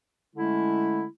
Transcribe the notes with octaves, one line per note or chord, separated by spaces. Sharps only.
D3 G#3 A3 C#4 E4